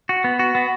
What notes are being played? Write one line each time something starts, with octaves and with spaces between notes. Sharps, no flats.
F#4
B3
F#4
B3